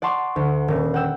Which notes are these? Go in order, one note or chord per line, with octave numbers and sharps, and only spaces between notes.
D5 F#5 A5 C6 C#6
D2
D#1
F#5 G5 E6